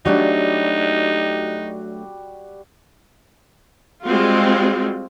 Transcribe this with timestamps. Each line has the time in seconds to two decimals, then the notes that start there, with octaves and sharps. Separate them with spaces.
0.05 F#3 G3 A3 D4 D#4 F#4 G4
4.03 G3 G#3 C4 F4 F#4